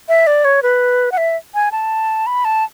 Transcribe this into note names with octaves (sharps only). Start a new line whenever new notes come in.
E5
D5
C#5
B4
F#5
E5
G#5
A5
B5
A5